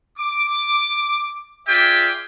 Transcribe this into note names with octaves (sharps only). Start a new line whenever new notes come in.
D6
F4 G#4 D5 E5 G5